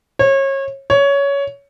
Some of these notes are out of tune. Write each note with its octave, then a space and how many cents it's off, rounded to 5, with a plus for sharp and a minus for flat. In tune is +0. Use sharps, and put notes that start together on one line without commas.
C#5 -30
C#5 +15